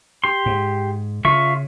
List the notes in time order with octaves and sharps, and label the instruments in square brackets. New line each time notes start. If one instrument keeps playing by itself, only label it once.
[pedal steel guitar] G4 C6
[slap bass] G#2
[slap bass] C#3 [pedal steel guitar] F4 E5 C#6